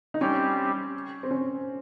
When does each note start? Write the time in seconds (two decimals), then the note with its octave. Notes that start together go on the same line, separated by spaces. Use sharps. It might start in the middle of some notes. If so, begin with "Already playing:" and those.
0.14 D#4
0.21 G3 C4 C#4 G4
1.23 C4
1.31 C#4